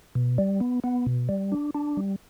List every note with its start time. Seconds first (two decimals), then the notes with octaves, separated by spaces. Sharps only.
0.15 B2
0.38 G3
0.60 B3
0.84 B3
1.06 B2
1.29 G3
1.52 D4
1.75 D4
1.97 G3